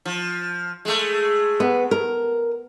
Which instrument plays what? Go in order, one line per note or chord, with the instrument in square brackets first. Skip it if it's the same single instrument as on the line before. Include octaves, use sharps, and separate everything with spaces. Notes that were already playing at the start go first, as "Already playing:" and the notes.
[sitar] F3
G#3 A3
[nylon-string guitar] B3
A#4